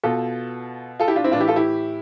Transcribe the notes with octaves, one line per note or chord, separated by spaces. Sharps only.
B2 F4 A4
F4 A4
E4 G4
D4 F4
C4 E4
A2 E3 D4 E4 F4 G4
F4 A4
E4 G4